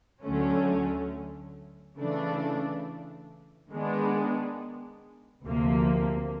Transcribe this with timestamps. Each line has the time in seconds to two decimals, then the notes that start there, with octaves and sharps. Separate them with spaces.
0.23 D2 D3 F#3 A3 C#4
1.97 C#3 E3 A3 D4
3.71 D#3 G#3 B3 D4
5.45 D2 C3 F3 A#3